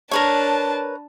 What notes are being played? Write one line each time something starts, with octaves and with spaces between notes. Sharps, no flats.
D4 A#4 B4 C#5 A5